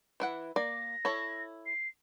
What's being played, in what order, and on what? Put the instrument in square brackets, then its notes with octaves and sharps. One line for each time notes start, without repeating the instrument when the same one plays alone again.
[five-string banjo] E3 E4 F#5
[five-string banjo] A#3 D5 [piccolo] A#6
[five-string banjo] E4 A4 C#5
[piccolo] C7